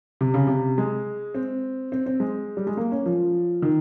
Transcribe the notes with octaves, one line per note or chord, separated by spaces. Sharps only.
C3
C#3
C3
G#3
C4
C4
C4
G#3
G3
G#3
A#3
C#4
F3
D#3